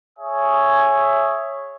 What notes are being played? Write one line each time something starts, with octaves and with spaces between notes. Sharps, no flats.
G#4 C#5 E5 G#5 D#6